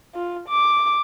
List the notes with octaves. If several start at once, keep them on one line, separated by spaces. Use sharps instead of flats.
F4
D6